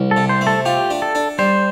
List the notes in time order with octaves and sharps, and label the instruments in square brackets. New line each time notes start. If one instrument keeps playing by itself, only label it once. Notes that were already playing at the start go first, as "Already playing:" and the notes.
Already playing: [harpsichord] C2
[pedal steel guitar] A4
[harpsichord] C3
[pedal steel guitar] C5
[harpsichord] A3
[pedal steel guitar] A4
[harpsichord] F4 [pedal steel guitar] G4
[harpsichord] D4
[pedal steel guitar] A4
[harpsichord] D4
[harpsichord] G3 [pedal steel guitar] C5